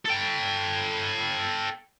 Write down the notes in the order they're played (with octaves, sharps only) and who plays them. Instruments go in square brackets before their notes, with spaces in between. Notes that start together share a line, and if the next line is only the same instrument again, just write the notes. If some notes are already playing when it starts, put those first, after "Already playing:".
[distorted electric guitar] A4 G5